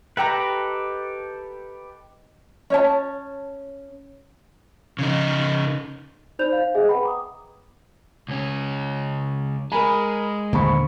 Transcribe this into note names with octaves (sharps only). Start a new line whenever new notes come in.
G4 A4 B4 D#5 G5 A#5
C#4 C#5 A5
C#3 D#4
D#4 C5 D5 B5 G6 F7
C5 F5
G#4 D#5 E5 F#5 G#5
B4 F#5 G5 B5
A#5 D6 D#6
C#2 C#4
G#3 A#4 G#5 B5
D#1 D3 A#3 C5 B5 C#6